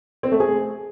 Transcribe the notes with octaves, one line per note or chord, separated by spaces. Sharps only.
C4
A3
G#4